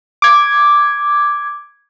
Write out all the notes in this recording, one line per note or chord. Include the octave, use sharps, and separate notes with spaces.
D6 G#6